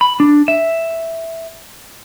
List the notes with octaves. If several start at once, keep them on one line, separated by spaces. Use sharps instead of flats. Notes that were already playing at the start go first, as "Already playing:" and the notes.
B5
D4
E5